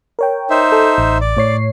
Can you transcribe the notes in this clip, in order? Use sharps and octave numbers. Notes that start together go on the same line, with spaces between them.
A#4 C#5 G5
D#4 C5 E5
A4
A1
D5
A2 C#5 C7